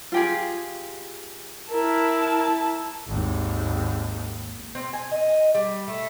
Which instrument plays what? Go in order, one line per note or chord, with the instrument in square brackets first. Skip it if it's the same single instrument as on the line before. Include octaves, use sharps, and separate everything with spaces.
[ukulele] F4 G4 G#4
[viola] E4 A5 [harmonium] A#4
[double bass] G#1 D#2
[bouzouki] C4
G#5
D#5
G3
A3